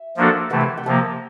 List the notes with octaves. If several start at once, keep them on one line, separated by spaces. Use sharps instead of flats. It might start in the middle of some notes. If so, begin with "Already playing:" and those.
Already playing: E5
F3 A#3 D4 F#4 A4
C3 E3 A3 F#5
G#5
G5
C3 F3 A#3 A5